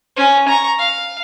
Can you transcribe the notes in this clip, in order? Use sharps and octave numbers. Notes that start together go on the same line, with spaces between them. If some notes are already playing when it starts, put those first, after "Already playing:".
C#4
A#5 C#6
F5